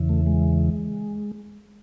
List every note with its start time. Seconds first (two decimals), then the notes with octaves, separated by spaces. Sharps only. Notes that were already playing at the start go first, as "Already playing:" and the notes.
Already playing: E2 C#3 E3
0.09 A3
0.26 G#3